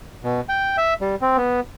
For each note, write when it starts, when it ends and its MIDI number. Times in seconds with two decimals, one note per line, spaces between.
0.24 0.41 47
0.49 0.77 79
0.78 0.94 76
1.01 1.15 55
1.22 1.37 60
1.37 1.60 59